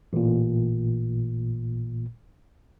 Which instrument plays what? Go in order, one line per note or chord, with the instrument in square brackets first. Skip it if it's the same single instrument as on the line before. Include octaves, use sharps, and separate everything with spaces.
[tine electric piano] A1 A#2